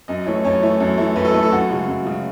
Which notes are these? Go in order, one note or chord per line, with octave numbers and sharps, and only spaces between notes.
F#2 D#5
E3 A3 C#5
F#2 C#5
E3 A3
F#2
E3 A3
F#2 B4
A4
E3 A3 B4
A4
F#2 F#4
C#3 G#3
F#2
C#3 G#3